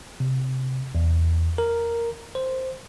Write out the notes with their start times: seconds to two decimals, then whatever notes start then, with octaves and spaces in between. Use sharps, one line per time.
0.20 C3
0.95 E2
1.58 A#4
2.35 C5